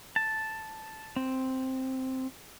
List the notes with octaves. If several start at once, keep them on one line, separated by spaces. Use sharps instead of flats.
A5
C4